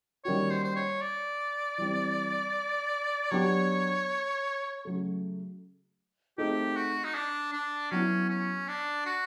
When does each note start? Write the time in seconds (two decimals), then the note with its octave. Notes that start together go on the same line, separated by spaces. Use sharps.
0.25 D#3 G3 A#3 C#4 F#4 C#5
0.51 C5
0.64 C5
0.76 C#5
1.02 D5
1.78 E3 G3 C4
3.31 F#3 B3 D4 G4 C#5
4.85 C#3 F#3 A3
6.38 A3 C4 D#4 G4 G#4
6.77 F#4
7.04 D#4
7.15 D4
7.53 D4
7.91 F#3 B3 C#4 E4
8.30 C#4
8.68 D4
9.06 F#4